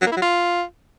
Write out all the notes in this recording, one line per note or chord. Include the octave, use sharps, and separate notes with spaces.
F#3
A#3
E4
F#3
F4